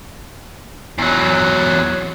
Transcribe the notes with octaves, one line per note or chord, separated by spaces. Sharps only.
E2 F#3